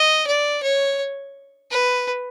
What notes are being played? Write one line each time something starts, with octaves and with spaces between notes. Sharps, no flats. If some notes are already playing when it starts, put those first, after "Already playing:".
Already playing: D#5
D5
C#5
B4